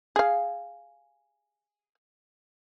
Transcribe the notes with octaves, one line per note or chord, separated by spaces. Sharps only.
G#4 F5